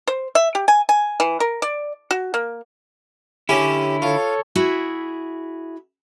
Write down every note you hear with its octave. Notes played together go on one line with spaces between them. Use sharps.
C5
E5
G4
G#5
G#5
E3
A#4
D5
F#4
A#3
D3 C#4 E4 G4
F4 A4 C#5
E4 F#4 G#4 E5